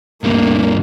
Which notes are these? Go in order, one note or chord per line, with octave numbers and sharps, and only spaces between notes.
D2 G2 A#3